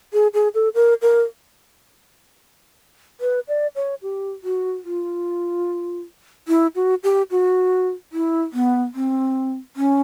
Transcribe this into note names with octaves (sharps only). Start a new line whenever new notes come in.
G#4
G#4
A4
A#4
A#4
B4
D5
C#5
G4
F#4
F4
E4
F#4
G4
F#4
E4
B3
C4
C#4